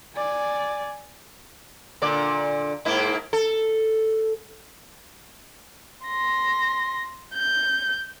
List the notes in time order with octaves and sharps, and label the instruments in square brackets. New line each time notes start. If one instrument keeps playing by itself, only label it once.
[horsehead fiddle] D5 G#5
[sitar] A#2 D3 D5
G#2 A#3 E4
A4
[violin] C6 A#6
G6